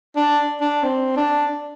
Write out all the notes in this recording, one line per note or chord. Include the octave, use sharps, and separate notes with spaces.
D4
D4
C4
D4